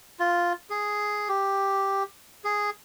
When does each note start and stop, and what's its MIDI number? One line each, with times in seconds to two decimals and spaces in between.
0.20 0.53 65
0.70 1.28 68
1.28 2.03 67
2.44 2.70 68